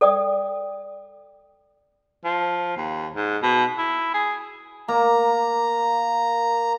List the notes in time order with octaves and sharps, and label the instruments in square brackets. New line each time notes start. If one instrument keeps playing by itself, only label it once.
[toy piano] A4 D5 G5 D#6
[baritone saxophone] F3
D#2
G#2
B2
E4
G#4
[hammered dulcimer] A#3 [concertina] A#5